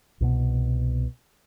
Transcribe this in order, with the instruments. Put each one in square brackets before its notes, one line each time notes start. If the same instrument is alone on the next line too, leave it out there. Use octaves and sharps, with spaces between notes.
[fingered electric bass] C2 B2 B3